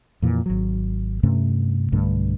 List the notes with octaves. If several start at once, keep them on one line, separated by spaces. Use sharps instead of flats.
F2 A#2 E3
G#1 F#3
G2 C3 A3 C#4
B1 G2 D3 A3